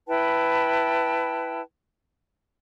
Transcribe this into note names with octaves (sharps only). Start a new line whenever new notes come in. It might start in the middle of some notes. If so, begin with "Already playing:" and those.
E4 B4 G5 A5